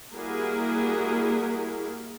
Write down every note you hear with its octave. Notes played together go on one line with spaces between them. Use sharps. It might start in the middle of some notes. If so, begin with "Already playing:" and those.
G3 A#3 E4 F#4 G#4 A#4